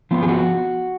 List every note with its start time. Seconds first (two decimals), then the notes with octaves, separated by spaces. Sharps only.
0.11 F3 B3 F4
0.23 G#4
0.28 F#4